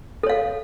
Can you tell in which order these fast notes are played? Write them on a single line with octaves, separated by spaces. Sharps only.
A4 C#5 F5